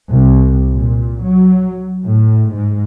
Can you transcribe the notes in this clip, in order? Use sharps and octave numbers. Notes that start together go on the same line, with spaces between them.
C2
A#2
F#3
A2
G#2